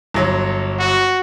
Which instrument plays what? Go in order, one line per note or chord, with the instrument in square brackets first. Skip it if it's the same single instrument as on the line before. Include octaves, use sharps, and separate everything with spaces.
[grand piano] G1 F#3
[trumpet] F#4